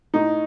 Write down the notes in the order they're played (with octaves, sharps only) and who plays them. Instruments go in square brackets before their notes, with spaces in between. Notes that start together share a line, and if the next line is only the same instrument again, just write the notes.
[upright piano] A2 D#4